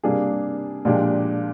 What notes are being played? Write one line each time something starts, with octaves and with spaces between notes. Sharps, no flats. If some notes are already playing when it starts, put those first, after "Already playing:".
C3 G3 A#3 D4 G#4
A#2 F3 G#3 D4 G4